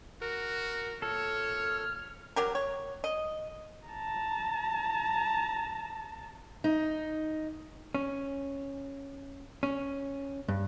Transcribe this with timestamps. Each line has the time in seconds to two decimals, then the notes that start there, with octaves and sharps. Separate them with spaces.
0.22 F#4 A#4
1.02 A#2 A4 C#5 F6
2.36 F#3 G4 A#4
2.55 C#5
3.04 D#5
3.88 A5 A#5
6.64 D#4
7.95 C#4
9.63 C#4
10.48 G2